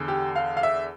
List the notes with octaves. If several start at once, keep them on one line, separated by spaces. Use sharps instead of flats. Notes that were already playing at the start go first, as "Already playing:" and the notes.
Already playing: E2 D3
G4
F5
F5
E5